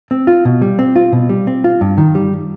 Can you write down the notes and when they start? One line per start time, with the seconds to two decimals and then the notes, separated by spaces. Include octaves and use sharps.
0.11 C4
0.27 F4
0.45 B2
0.62 G3
0.79 C4
0.96 F4
1.13 B2
1.29 G3
1.47 C4
1.64 F4
1.81 G2
1.98 D#3
2.15 G3